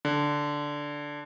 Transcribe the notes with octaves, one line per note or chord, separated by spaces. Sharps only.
D3